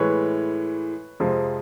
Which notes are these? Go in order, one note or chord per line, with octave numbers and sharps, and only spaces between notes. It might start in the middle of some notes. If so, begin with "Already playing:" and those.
Already playing: A2 E3 G#3 B4 C#5
F2 C3 F3 G#3